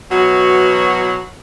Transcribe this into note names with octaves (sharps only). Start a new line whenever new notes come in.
B2 E3 F#3 F#4